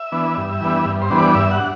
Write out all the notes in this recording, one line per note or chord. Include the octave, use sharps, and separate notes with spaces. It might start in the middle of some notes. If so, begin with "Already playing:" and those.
Already playing: E5
E3 B3 D4
G2
E3 G3 B3 D4
G2
C5
E3 G3 B3 D4
D5
G2 E5
F#5
D4